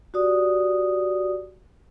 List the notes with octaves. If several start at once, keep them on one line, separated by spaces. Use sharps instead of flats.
F#4 G4 D5 D#6